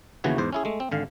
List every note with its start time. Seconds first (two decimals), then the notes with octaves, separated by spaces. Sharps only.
0.24 D#2 C#3 E3 B3 F#4 C#5
0.38 E2 G#2 C5
0.53 C#4 E4 G#4
0.65 G#3 A3
0.80 C4
0.91 G#1 D3 F5